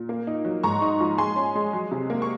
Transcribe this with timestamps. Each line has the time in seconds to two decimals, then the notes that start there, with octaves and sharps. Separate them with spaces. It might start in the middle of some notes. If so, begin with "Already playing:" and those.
Already playing: A#2
0.09 A#3
0.27 D#4
0.45 F#3
0.63 G#2 A#5 C#6
0.82 D#4
1.00 F3
1.18 G#3 G#5 C6
1.36 C#4
1.55 G#3
1.73 F#3
1.91 C3
2.10 A#3
2.22 C#6